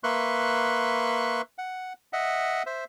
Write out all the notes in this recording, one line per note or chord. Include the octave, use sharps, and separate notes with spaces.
A#3 B4 E5 C6 C#6 F#6
F#5
D#5 E5 F#5
C5 E5